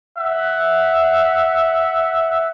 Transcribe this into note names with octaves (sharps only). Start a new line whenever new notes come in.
E5 F#5